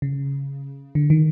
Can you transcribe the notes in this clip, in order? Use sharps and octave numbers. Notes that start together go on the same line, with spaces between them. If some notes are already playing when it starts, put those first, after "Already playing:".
C#3
D3
D#3